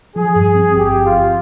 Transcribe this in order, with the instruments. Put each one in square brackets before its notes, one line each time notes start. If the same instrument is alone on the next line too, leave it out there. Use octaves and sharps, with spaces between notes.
[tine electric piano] F3 [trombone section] G#4
[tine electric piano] G2
C4
[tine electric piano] G#1 [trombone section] G4
[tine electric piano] F3
[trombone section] F4
[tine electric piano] G2